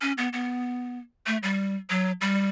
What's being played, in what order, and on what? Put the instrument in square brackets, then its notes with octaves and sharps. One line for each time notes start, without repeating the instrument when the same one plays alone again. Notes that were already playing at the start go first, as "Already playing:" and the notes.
[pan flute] C#4
B3
B3
A3
G3
F#3
G3